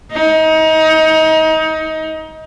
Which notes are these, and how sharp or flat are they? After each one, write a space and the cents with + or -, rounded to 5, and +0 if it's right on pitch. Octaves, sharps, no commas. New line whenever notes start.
D#4 +25